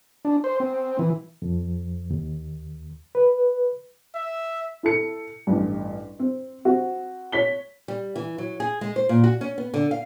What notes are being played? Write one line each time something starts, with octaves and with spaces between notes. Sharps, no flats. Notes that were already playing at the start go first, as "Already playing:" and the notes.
D4
C5
C4
E3
F2
D#2
B4
E5
E4 A4 C#7
A1 G2
C4
C4 F#4
C#5 B6 G7
G3
E3
F#3
G#4
G#3
C5
A#2
F#4
C#4
B3
D3
F5